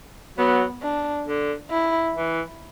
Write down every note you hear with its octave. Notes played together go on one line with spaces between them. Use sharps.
F#3 B3
D4
D3
E4
E3